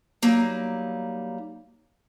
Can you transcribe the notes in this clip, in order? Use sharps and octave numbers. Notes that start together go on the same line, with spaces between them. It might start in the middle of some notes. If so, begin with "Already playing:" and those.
F#3 G3 A#3 D#4